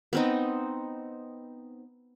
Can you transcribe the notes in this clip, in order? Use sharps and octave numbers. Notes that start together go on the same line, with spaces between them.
B3 C4 D#4